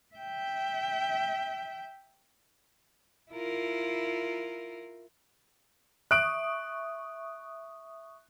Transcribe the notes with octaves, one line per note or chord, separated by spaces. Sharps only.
E5 G5
E4 F4 A#4
E5 C#6 D#6 F#6 D7